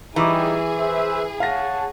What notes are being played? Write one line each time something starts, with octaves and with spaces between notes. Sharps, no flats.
E3 G3 D#4 G4 G#4 A#5 C#6 D6
B4 C5 E5
C#5 F5 F#5 A5 A#6